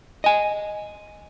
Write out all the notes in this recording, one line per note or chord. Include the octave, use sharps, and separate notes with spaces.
D#5 G#5